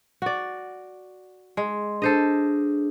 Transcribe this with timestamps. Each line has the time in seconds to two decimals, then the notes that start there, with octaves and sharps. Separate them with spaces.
0.22 F#4 D5
1.57 G#3 C6
2.02 D4 G#4 A4 C5 D#5